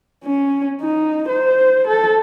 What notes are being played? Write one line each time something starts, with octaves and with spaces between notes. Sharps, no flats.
C#4
D#4
C5
A4